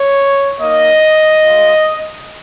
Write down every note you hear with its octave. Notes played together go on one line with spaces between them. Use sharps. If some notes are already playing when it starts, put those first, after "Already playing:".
Already playing: C#5
A#3 D#4 D#5
G#3 F4